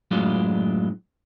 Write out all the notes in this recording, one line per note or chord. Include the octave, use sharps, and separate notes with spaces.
F#2 A2 F#3 G#3 D4 F4